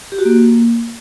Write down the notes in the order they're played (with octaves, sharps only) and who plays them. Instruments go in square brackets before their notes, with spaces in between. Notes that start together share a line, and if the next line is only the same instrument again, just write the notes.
[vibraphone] G4
F#4
A#3